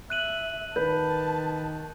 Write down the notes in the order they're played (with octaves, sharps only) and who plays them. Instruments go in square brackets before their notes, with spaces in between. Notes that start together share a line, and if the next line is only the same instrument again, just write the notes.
[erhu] E5 [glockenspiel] F#6 D#7 F#7
[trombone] D#3 [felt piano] B4 [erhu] A5 [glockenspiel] G6